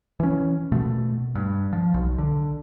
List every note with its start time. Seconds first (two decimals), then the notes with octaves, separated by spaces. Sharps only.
0.20 E3 C#4
0.72 B2 A3
1.35 G2
1.73 F3
1.94 B1
2.18 D3